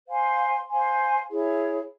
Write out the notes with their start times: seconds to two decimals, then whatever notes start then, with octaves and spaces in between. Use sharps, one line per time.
0.07 C5 F5 G#5 C6
0.69 C5 F5 G#5 C6
1.29 E4 G#4 C#5